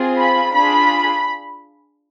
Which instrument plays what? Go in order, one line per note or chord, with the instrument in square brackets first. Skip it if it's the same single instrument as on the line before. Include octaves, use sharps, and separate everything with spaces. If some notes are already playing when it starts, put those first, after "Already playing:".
Already playing: [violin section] C4 F4 G#4
B5
D4 F4 G#4 B5